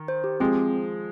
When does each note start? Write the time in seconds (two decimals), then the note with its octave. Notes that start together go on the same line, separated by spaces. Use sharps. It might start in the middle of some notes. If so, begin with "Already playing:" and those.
Already playing: D#3
0.08 C5
0.24 G4
0.40 F3 G#3 C4